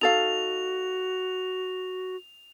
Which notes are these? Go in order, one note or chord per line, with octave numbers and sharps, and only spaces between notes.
D#4 F#4 A4 F5 F7